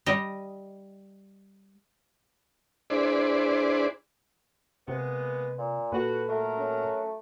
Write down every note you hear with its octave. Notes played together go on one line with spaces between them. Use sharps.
G3 D#5
D4 E4 G#4 B4 C5 D5
C3 G#3 A#3 B3 B4
A#2
A#2 F#4 A4 B4
F#3 A3 A#4
C#4